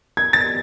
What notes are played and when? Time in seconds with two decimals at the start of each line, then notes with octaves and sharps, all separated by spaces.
0.17 G#6
0.33 A6